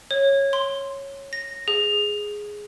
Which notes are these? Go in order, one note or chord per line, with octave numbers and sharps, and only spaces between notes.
C#5
C6
A#6
G#4